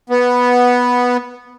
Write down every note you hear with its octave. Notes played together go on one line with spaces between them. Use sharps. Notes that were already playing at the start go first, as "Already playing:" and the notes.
B3